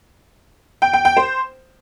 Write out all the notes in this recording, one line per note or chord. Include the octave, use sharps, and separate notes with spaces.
G5
G5
G5
C5